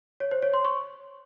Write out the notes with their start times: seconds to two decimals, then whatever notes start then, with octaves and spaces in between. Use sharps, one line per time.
0.20 C#5
0.31 C5
0.42 C#5
0.54 C6
0.65 C#6